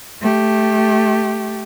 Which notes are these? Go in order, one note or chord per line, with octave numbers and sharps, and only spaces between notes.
A3 G4